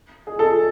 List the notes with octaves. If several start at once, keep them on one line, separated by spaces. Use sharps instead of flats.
G#4
A4